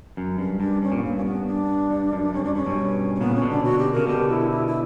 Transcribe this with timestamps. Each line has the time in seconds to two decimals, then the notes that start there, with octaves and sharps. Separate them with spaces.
0.17 F#2
0.38 G2
0.60 G2 D4
0.82 G2 C#4
0.92 A#2
0.97 B3
1.01 G2 A#3
1.17 C#4
1.25 B3
1.47 D4
1.90 G2
2.12 F#2
2.34 G2 C#4
2.44 F#2 D4
2.55 G2 C#4
2.66 G2 B2
3.15 C#4
3.20 A#2 C#3 B3
3.35 C#4
3.42 B2 D3
3.50 D4
3.63 F#4
3.79 G4
3.93 C#3 A#4
4.07 B2 D3 G4
4.29 E4
4.51 E4
4.67 E4